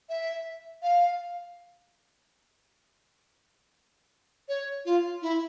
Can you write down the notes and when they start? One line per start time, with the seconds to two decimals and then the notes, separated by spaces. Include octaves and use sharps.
0.09 E5
0.83 F5
4.49 C#5
4.85 F4
5.22 E4